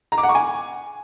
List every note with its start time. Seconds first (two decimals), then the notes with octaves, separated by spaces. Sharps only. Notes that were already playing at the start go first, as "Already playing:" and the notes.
0.12 A#5
0.18 D6
0.23 F#5
0.29 C#6
0.35 G#5